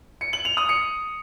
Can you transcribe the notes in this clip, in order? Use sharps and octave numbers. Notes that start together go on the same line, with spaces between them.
C#7
F#7
F7
D#6
C#7